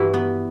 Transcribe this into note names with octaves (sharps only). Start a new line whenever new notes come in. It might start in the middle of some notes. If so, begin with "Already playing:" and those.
Already playing: G2 E3 E4 F#4
B3